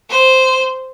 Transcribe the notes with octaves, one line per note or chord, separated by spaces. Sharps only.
C5